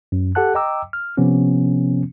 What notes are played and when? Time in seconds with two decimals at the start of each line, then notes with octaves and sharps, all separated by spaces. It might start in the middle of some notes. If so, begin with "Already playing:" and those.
0.12 F#2
0.35 G4 A4 F#5 A5 F#6
0.55 D#5 G5 A#5 D6 E6
0.93 F6
1.17 C3 F3 B3 C#4